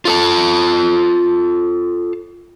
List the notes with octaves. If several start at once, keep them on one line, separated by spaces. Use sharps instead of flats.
F4 A4 A5